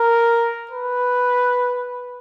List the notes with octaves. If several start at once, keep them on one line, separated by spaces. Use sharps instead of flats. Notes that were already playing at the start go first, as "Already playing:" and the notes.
Already playing: A#4
B4